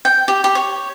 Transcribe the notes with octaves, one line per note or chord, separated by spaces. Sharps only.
G5
G4
G4
C#5